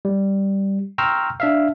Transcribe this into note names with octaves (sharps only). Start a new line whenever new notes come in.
G3
G5 A#5 C6 C#6 E6 F6
D4 E5 F5